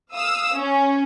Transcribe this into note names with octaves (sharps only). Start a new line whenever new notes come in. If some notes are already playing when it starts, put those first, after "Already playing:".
F5 D#6 E6
C#4